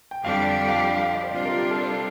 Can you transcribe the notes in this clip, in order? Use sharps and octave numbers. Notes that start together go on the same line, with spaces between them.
G5
F2 D3 G3 D4 G4 F5
F5
G5
F5
D#5
C5
C3 G3 D4 F4 D5
A#4
G4
A4
C5